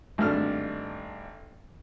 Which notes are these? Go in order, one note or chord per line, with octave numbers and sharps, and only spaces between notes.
G#1 G2 A3 D4 F6